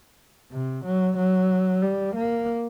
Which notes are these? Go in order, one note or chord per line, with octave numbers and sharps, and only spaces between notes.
C3
F#3
F#3
G3
A#3